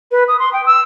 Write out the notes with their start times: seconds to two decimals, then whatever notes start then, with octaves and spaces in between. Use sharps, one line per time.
0.11 B4
0.28 D#6
0.39 C6
0.53 G5
0.66 E6